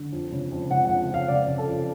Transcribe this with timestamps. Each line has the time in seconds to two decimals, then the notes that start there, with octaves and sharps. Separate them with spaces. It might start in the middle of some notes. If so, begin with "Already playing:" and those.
Already playing: D3
0.12 F2
0.32 C#3
0.51 F2
0.70 C#3 F#5
0.85 F#5
0.90 F2
1.09 F2 F5
1.28 C#3 D5
1.48 C#3
1.58 A4
1.67 F2